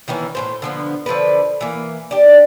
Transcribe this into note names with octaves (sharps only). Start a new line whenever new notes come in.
D#3 E3 B3 C#4
A2 C#3 C5
D3 F3 B3
D3 F3 A4 B4
E3 A#3
D4 G4